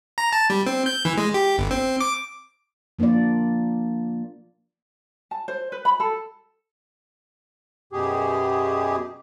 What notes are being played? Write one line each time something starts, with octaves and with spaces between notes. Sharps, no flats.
A#5
A5
G3
C4
G6
E3
G#3
G4
G1
C4
D6
F3 A#3 D4 F4 D5
A5
C5
B4
B5
A4
F#2 B2 G4 G#4